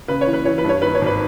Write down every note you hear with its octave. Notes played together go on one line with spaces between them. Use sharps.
C#3 B4
C#5
E3
B4
E3 C#5
B4
G2 C#5
D#3 B4
C#5
G#1 B4